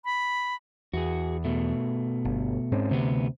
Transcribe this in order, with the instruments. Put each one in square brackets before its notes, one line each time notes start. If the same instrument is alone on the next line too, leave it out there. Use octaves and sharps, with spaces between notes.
[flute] B5
[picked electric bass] E2 [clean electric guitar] F#4 G#4
[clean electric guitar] B2 A3
[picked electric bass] G1
G#2 C4 C#4
[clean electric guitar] D2 B3 [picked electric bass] C3